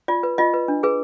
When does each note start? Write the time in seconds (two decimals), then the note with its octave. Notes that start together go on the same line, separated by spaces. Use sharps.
0.08 F4 D5
0.23 B4
0.38 F4 D#5
0.54 B4
0.68 D4
0.83 G#4 B4